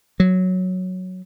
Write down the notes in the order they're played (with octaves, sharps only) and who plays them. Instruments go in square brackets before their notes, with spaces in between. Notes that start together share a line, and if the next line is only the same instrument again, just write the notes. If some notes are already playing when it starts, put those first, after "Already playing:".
[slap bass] F#3